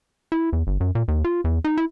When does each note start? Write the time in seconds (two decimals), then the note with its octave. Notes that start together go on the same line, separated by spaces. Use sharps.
0.32 E4
0.53 E2
0.67 G1
0.80 F#2
0.95 A#2
1.08 D#2
1.24 F4
1.44 E2
1.64 D#4
1.77 E4